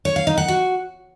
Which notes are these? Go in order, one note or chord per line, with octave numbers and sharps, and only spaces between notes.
C#5
F5
D#4
F#5
F#4